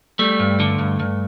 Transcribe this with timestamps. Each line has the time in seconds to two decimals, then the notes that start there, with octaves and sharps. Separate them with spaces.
0.19 G3 A3
0.40 G2
0.60 D3
0.79 G2
1.00 G2